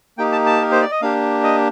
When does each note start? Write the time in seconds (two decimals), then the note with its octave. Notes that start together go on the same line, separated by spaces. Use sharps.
0.18 A#3 D#4 G4 G5
0.32 A5
0.46 A5
0.61 A#4
0.72 C5
0.81 D5
0.91 D#5
1.02 A#3 D4 G4 F5
1.44 D#5